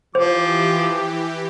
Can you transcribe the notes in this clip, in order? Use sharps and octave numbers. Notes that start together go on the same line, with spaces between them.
E3 F3 G4 C5 D6